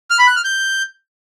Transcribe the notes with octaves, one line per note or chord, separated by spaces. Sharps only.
F6
B5
F#6
F6
G6